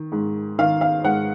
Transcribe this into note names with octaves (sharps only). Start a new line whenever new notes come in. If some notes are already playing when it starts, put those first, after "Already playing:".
Already playing: D#3
G#2
D#3 F5
F5
G#2 F#5